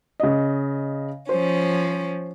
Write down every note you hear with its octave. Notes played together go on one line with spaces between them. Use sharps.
C#3 D#5
F3 C#4 C5